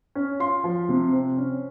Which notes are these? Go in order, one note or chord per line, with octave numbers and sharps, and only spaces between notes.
C#4
F4 C6
F3
C3
C4
C#4